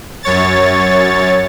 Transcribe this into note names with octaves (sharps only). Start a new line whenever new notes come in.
F#2 C#5 A6